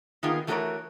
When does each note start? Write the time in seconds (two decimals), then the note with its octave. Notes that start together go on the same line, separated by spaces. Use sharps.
0.23 D#3 A#3 B3 F4 G#4
0.47 E3 A3 F#4 A4 A#4 C#5